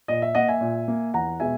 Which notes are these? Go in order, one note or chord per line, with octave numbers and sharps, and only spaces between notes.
A#2 D#5
E5
A#3 D#5 F#5
E5 G#5
A#2
A#3
E2 F#5 A#5
B2 G#3 E5 G#5